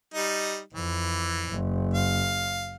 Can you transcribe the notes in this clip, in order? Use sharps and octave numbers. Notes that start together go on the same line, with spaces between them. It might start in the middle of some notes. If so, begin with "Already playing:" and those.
G3 D#4
F2 E3
F#1
F5